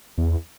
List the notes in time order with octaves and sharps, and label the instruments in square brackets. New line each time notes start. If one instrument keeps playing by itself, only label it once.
[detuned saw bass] E2